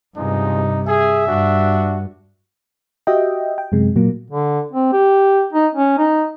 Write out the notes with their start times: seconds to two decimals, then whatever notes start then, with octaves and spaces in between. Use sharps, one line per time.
0.16 E2 G2 C3 F3 G#3 D#4
0.87 G#4 E5
1.27 G2 D4 F#4
3.07 F#4 G4 D#5 E5 G5
3.58 G5
3.72 F#2 C3 G#3
3.96 A#2 F#3 A#3
4.30 D3
4.72 C4
4.93 G4
5.53 D#4
5.75 C#4
5.98 D#4